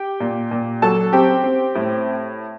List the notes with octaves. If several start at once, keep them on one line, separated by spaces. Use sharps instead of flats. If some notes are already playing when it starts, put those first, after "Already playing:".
Already playing: G4 G5
A#2
A#2
F#3 A4 A5
C4 G4 G5
C4
A2